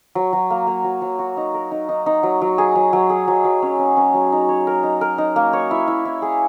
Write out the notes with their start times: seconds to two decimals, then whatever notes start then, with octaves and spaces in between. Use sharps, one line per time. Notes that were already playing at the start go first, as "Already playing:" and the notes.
0.15 F#3
0.33 F#3
0.50 A#3
0.67 A#3
0.84 F#3
1.02 F#3
1.19 F#4
1.37 D#4
1.54 A#4
1.71 D#4
1.89 D#4
2.06 D#4
2.23 F#3
2.41 F#3
2.58 G#4
2.75 F#3
2.93 F#3
3.10 G#4
3.28 F#3
3.44 F#3
3.62 C#4
3.79 C#4
3.97 C#4
4.14 F#3
4.32 D#4
4.49 C#5
4.67 A#4
4.83 D#4
5.01 A#4
5.18 D#4
5.36 A#3
5.53 C#5
5.71 E4
5.88 E4
6.05 E4
6.22 G#4